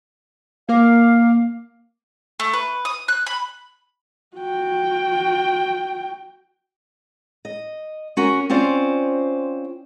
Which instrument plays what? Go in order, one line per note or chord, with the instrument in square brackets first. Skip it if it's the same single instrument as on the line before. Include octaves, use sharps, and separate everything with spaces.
[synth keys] A#3 A#4 D6 [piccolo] F5
[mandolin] A3
B4
D#6
F#6
B5
[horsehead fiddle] F#4 G5
[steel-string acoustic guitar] D#5
C#4 F#4 A#4
C4 C#4 F4 C5 D5